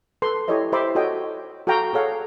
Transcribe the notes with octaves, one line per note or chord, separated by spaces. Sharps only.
A4 B4 C6
E4 G4 A4 C#5 D#5 E5
G4 C5 E5 B5 C6 D6
F#4 A4 C#5 D#5 G5
F#4 A4 F5 G5 A#5 C#6
G#4 A4 C#5 F5 F#5